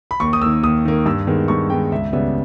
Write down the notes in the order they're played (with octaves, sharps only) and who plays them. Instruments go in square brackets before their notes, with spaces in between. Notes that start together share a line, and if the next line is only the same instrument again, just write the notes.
[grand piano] B5
D#2 C#6
D#6
D#3 A#3 E6
D#2 D#6
D#3 A#3
G2 E6
D#3 G#3 B3
G2 C#6
D#3 G#3 B3 G5
C#2 E5
C#3 G3 B3 E5